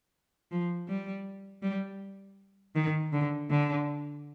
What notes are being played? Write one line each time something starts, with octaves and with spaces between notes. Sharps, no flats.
F3
G3
G3
D#3
D3
D3